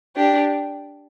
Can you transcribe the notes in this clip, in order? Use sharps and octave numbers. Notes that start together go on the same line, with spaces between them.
D4 G4